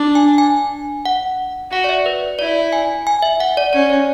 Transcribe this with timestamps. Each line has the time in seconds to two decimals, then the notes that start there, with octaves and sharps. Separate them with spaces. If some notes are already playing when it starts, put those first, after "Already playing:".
Already playing: D4
0.15 G#5
0.38 G#5
1.05 F#5
1.71 F#4 F#5
1.84 D5
1.89 E5
2.06 B4
2.39 E4 D5
2.73 G#5
3.07 G#5
3.22 E5
3.40 F#5
3.57 D5
3.73 C#4 D5
3.90 C#5